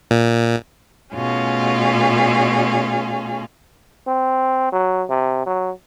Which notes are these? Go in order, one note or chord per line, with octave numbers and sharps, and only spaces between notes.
A#2
B2 A3 C#4 F4 G#4
C4
F#3
C3
F#3